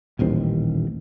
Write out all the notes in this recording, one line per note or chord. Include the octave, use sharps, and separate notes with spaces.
D#1 A1 D#2 C4